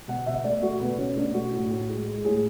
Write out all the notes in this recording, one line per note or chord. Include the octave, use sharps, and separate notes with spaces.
B2 F#5
B2 E5
A3 D5
A3 F#4
B2 B3
B2 C#4
A3 D4
A3 F#4
A2
A2
G#3
G#3
A2 G#4